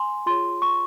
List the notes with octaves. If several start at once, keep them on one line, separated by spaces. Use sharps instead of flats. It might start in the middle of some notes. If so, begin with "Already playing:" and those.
Already playing: G#5 C6
F4 G#4 C#5 C6
C#6